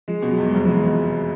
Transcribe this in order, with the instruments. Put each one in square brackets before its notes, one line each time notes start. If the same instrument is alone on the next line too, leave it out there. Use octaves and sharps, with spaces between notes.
[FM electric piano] F3 [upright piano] G#3
[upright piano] B2
[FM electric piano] F#3
[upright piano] E2
[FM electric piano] G#3
[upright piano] F1 [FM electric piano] G3
[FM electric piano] F3
[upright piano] G#3
[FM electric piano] E3
[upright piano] B2